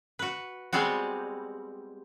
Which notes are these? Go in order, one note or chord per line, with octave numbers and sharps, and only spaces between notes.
F#4 B4
G3 G#3 B3 C4 F#4